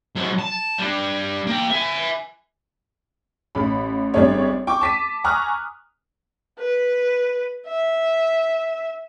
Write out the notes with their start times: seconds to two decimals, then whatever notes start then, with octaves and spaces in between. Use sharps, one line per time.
0.16 G#2 F#3
0.39 A5
0.78 G3 D4
1.47 A#3 G5
1.70 E5 G#5
3.55 A1 B5
4.14 G#1 G3 A3 C4 D4 C#5
4.67 G5 C#6 D6
4.81 A5 B6 D#7
5.24 G#5 A#5 C#6 D#6 F6 F#6
6.59 B4
7.67 E5